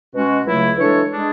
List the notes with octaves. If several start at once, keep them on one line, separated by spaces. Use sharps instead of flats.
B2 G#3 C#4 F#4
C#2 C#3 F#3 A3 E4
E3 G#3 D4 A4 C#5
G#3 D4 G#4